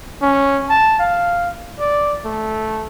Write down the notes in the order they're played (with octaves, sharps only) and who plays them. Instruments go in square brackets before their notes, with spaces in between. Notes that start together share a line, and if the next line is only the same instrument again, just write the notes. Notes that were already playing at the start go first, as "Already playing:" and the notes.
[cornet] C#4
A5
F5
D5
A3